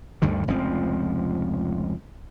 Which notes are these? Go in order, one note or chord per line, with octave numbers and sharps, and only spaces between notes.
D2 G2 D3 D#3
F1 C#2 F3 C4